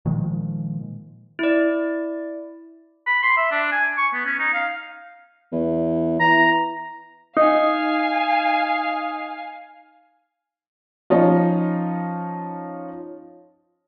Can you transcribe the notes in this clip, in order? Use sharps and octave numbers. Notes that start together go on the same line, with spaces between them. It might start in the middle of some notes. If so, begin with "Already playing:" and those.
A#2 D#3 F3 G#3
E4 D5
B5
C6
E5
D4
G#5
C#6
B3
C#4
D#4
F5
E2
E3 A#5
D#4 F5 G#5
F3 C#4 D#4 F4